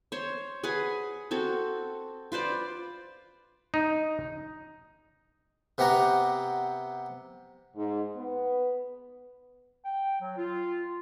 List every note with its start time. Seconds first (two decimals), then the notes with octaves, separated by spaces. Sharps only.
0.12 C5 C#5
0.63 G#4 B4 F#5 G#5
1.31 C4 F#4 A4
2.32 F4 B4 C5 D5
3.74 D#4
5.78 C3 B3 G4 F#5 A#5
7.76 G#2
8.16 B3
9.85 G5
10.21 F#3
10.37 F4